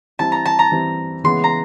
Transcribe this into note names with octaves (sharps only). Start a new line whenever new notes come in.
E3 G3 C4 E4 A5
A#5
A5
A#5
E3 G3 C4 E4
C#3 E3 G#3 B3 C6
A#5